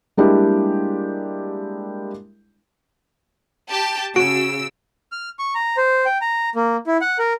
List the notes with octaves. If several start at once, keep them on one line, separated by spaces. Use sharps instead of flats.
G3 G#3 A#3 D4 E4 G4
G4 A5
C#3 F#4 E6 D7
F6
C#6
A#5
C5
G5
A#5
A#3
E4
F#5
A#4